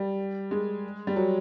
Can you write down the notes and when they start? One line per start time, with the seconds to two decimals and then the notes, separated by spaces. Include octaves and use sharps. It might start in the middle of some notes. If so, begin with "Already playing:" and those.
Already playing: G3
0.51 G#3
1.07 G3
1.16 F#3